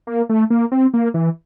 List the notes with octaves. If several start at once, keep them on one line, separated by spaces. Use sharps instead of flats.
A#3
A3
A#3
C4
A#3
E3